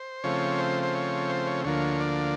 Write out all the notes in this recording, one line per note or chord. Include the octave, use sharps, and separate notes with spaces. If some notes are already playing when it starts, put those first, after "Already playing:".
Already playing: C5
C#3 F3 A3 C4 C#5
C5
C5
C#5
C5
C#5
D2 D3 F3 A#3 C#5
D5